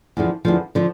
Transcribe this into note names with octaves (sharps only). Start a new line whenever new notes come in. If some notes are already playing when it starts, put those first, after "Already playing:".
E2 D3 F3
E2 D3 F3
D3 F3